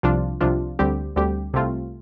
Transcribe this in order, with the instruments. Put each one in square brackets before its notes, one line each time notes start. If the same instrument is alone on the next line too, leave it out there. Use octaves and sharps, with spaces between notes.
[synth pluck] C2 C3 F3 D4 F4
C2 C3 F3 D4 F4
D2 D3 G3 C4 G4
D2 D3 G3 C4 G4
C2 C3 A3 C4 F4